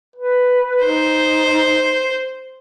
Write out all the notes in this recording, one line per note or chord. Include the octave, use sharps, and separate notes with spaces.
B4
D#4 C5